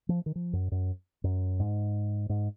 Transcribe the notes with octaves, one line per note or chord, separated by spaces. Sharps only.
F3
D#3
F3
F#2
F#2
F#2
G#2
G#2